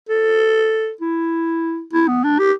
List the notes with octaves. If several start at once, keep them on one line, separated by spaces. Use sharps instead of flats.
A4
E4
E4
B3
D4
G4